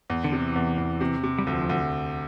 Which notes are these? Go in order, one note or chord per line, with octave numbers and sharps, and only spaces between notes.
E2
D3
C3
E3
E2
E2
C3
C3
G3
D2 F3
D2